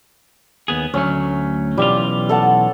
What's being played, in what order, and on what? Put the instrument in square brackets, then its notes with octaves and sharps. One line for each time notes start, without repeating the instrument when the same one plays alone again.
[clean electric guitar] D#2 B3 G#4
[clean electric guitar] D2 F#3 A3 [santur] C#4
[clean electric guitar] B1 E3 F4 [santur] G3
[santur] A4 F#5 A5